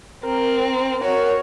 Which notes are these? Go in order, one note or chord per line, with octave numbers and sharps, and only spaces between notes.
C4 A#4
F#4 C#5